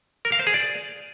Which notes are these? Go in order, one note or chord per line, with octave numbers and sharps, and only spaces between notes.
A#4
F5
C5
G#4
D5